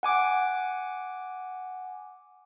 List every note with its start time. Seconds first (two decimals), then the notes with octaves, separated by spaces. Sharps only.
0.03 F#5 G#5 D6